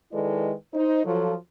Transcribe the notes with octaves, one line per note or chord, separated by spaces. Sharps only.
D#3 G#3 E4 A4 B4 D5
D#4 C5
F3 F#3 A4